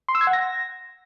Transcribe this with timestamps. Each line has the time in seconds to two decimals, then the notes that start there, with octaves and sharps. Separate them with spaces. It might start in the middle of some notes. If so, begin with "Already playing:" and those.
0.09 C6
0.15 E6
0.21 G#6
0.27 F#5
0.33 A#6